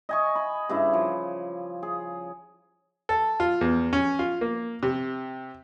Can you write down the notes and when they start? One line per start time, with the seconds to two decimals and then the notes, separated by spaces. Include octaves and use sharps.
0.09 D#5 G#5 C#6
0.35 B5
0.69 G2 C#3 E4
0.93 F3
1.83 G#4
3.09 A4
3.40 F4
3.61 E2
3.93 C#4
4.19 F4
4.41 A#3
4.83 C3